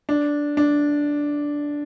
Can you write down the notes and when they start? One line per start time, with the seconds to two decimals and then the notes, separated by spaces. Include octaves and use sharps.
0.09 D4
0.57 D4